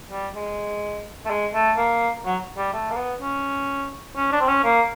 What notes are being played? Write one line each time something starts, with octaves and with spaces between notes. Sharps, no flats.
G3
G#3
A3
G#3
A3
A#3
F#3
G3
A3
A#3
B3
C#4
C#4
D4
C4
C#4
A#3